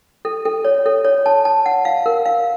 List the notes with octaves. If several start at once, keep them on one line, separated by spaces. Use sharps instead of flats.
A4
A4
C#5
A4
C#5
A5
A5
F#5
F5
A#4
F5